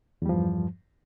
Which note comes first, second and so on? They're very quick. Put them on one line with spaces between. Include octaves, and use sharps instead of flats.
E2 G3 F3 G2